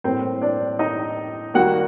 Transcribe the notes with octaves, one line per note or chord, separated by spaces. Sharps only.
A2 G3 A#3 C4 C5
D4 D5
D#4 D#5
D#2 D#3 G3 A#3 F#4 F#5